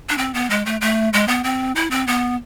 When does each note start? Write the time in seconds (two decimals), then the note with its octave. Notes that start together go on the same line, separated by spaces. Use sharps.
0.09 D4
0.18 C4
0.34 B3
0.50 G#3
0.66 A3
0.81 A3
1.13 G#3
1.28 B3
1.44 C4
1.75 E4
1.91 C4
2.07 B3